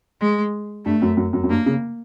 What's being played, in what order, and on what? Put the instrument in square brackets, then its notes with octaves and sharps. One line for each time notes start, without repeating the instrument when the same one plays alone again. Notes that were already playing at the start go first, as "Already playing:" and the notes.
[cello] G#3
[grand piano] G2 [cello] A3
[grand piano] F#2
F#2
F#2
F#2
[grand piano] G2 [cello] A#3
[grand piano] C#3